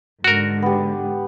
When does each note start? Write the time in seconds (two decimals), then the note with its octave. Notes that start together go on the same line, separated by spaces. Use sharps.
0.24 G#2 D3 F#4 A#4
0.62 B3 G4